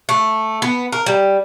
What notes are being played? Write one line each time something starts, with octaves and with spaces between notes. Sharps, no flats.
A3
B3
A#4
G3